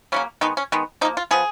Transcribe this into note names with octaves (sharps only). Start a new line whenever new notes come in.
C#3 F#3 A#3 C#4
D#3 G#3 B3 D#4
C#4
D#3 G#3 B3
F3 A#3 D#4
F4
F3 B3 G#4